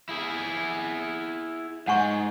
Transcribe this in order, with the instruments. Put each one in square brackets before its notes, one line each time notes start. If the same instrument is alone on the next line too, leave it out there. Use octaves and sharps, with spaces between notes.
[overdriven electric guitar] E4 G#4
[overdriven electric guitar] G#2 [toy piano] F#5 G#5 C#6